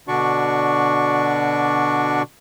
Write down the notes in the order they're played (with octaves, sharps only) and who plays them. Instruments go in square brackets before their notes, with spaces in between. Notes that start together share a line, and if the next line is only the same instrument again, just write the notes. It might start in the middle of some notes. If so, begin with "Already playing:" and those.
[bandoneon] B2 D3 D4 F#4 D5 C#6